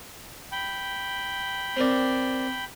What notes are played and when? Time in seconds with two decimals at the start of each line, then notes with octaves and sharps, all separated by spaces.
0.52 G5 B5
1.76 C4 A#4 D5